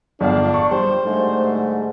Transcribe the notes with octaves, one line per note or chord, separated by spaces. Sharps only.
G1 D4 D5 F5
C#6
G3 C5
G#2 D3 A3